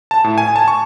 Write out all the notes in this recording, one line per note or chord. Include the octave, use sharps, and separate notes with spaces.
A5
A2
G#5
A5
C#6